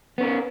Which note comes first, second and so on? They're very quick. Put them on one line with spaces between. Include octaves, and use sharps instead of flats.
B3 C#4 A#4